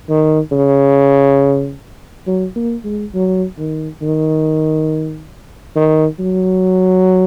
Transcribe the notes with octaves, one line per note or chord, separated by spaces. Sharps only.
D#3
C#3
F#3
A#3
G#3
F#3
D#3
D#3
D#3
F#3